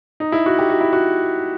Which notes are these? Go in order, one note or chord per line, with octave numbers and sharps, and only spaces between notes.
D#4
E4
F#4
G4
F#4
E4
F#4